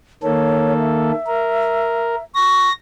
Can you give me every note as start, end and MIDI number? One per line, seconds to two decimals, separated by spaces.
0.23 1.12 51
0.23 1.12 58
0.23 1.12 69
0.23 0.74 73
0.80 2.24 76
1.27 2.15 70
2.35 2.69 85
2.35 2.73 94